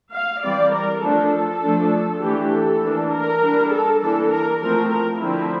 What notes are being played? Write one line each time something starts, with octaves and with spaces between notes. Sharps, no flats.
F5
E3 G3 C4 D5
A#4
F3 A3 D4 A4
F3 A3 D4
E3 A3 D4 G4
A4
E3 A#3 D4
A#4
G3 D4
A4
E3 A#3 D4 A4
A#4
F3 A3 C4 A#4
A#4
D3 F3 A3 C4 E4